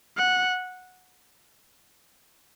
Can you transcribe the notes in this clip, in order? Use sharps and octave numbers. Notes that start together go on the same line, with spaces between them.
F#5